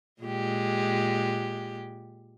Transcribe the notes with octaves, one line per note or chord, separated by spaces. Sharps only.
A#2 G#3 G4